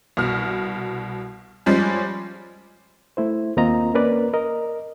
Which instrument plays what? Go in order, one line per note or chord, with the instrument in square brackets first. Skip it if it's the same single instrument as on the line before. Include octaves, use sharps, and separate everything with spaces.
[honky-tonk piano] C2 B2 F6
F3 G3 G#3 C#4
[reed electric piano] A3 E4 C5
D#2 A#3 C4 F4 D#5 A#5
A#3 C#4 A#4 B4 D5
A#4 D#5